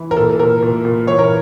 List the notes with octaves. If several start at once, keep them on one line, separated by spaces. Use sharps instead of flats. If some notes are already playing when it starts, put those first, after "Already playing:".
Already playing: E3
A#4
A#2 A4
A#2 A#4
A#2
A#2
E3 C#5
A#4